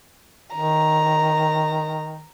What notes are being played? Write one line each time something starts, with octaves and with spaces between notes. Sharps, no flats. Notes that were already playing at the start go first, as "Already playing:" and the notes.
D#3 A#5